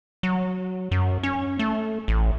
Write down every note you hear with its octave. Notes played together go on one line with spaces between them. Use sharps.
F#3
F#2
C#4
A3
A1